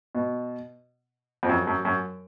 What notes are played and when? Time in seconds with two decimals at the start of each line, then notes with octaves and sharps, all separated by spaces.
0.15 B2
1.43 F2
1.49 F#2
1.67 F#2
1.85 F#2